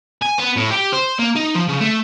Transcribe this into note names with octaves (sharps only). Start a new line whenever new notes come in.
G#5
B3
A2
G4
C5
A#3
D#4
F3
C#3
A3